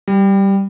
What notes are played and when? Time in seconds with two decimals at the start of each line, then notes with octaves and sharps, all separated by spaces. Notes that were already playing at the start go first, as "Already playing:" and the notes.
0.08 G3